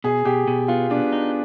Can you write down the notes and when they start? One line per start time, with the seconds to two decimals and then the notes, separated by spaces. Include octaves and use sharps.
0.04 B2 G#4
0.25 B2 G4
0.48 B2
0.68 B3 F4
0.90 B3 D4
1.12 D#4